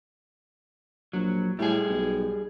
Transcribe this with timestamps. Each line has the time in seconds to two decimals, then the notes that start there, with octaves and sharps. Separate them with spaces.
1.13 A#1 F#3
1.59 A2 G3 G#4
1.89 B1